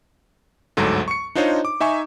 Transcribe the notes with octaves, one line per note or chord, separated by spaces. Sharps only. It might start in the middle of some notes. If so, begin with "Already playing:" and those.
G1 D2 G#2 F#3 A4
C#6 C#7
D4 D#4 F4 C5 C#5 D#5
D6
D#4 E5 G#5 C#6